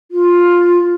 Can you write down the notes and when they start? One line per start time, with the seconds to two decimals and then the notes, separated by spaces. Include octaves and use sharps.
0.11 F4